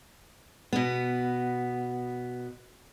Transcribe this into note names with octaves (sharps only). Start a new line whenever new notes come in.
B2 B3